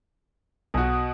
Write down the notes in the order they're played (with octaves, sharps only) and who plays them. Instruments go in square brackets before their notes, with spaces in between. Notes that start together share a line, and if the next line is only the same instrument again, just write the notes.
[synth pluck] B1 G#5 [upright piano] B2 F#4